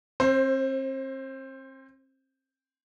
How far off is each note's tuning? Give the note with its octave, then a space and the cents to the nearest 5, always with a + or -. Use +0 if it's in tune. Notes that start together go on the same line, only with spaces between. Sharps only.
C4 +35 C5 +5